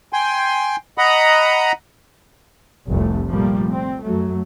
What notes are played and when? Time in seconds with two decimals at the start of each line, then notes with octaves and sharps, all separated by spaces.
0.13 G5 G#5 C6
0.98 D#5 F#5 A#5 B5 D#6
2.87 F1 C2 F2 A3
3.29 A#2 F3 G3 A3 A#3
3.70 C4
4.03 F#2 F#3 A3